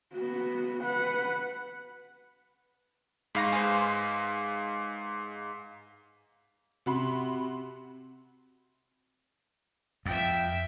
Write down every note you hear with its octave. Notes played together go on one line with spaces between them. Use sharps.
B3 F#4
B4 F#5
G#2 F5 B5 C#6 A#6
G#4 B4 C5
C3 F#4 B5 C6
F2 E5 G5